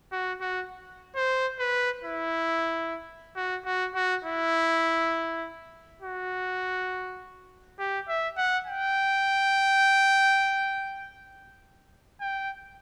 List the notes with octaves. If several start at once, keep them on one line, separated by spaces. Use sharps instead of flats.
F#4
F#4
C5
B4
E4
F#4
F#4
F#4
E4
F#4
G4
E5
F#5
G5
G5